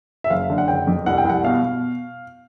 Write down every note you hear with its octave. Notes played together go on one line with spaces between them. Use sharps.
E5
F#1 F5
D3
F#5
F#1 G5
F2
C2 F#5
G5
C2 F#5
B2 F5
B2